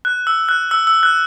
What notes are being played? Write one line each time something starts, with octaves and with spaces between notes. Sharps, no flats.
F#6
E6
F#6
E6
E6
F#6